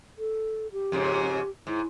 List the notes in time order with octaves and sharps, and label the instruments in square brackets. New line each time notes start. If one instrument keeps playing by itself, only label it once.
[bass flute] A4
G4
[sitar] F2 G#2 C#3
[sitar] G#2 [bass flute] E4